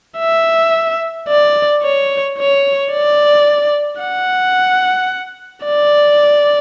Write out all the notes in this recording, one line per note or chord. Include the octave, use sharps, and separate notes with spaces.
E5
D5
C#5
C#5
D5
F#5
D5